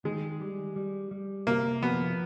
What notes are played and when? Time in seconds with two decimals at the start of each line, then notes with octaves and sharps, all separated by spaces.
0.05 D#3 G#3
0.41 G3
0.76 G3
1.11 G3
1.47 C3 A#3
1.82 F3 B3